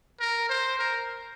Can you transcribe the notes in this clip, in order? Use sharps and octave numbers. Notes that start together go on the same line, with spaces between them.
A#4
C5
A#4